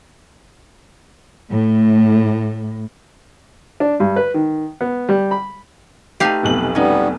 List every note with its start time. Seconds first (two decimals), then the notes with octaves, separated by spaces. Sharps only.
1.50 A2
3.80 D4
4.00 G2
4.16 B4
4.34 D#3
4.81 B3
5.09 G3
5.31 B5
6.20 A3 D#4 G4 B4 F5
6.43 F1 B1 F#7
6.75 G3 B3 C#4 D#4